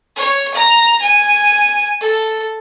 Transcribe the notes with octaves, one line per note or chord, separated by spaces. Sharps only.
C#5
A#5
G#5
A4